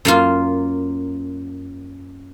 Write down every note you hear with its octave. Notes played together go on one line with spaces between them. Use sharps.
F#2 A#3 F4